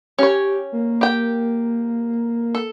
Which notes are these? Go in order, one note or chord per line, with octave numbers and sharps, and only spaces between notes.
C#4 G4 C#5
A#3
G4 G5
A4